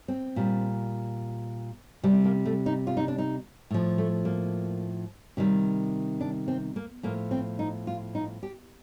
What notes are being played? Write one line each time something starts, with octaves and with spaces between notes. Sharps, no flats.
C4
A#2 G3
C3 G3 C4
A#3
A3
D#4
F4
D#4
D4
D#4
A2 F3
A3
A#3
C3 D#3 G3
D4
C4
A#3
A2 F3 A#3
C4
D#4
F4
D#4
G4